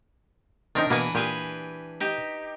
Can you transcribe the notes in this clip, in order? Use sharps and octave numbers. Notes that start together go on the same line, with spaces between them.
D#3 C4 D4 D#4 A#4
B2 E3 A#3 B4
A#2 G4 G#4 B4
D#4 G4